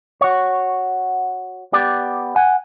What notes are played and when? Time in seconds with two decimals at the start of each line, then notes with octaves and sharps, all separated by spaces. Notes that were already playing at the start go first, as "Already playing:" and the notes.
0.21 F#4 C#5
1.73 B3 G4 D5
2.36 F#5 G#5